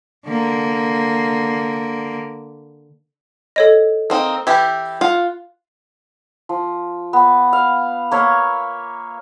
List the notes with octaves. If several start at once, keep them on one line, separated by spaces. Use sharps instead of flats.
D3 A#3
A4 C#5 D#5
A#3 C4 D#4
E3 E4 G4
F4 F5 F#5
F3
B3
F5
A#3 C#5 E5 F5